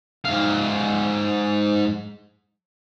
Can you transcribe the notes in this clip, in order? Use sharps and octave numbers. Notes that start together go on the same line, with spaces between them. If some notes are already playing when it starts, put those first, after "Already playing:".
G#2 F5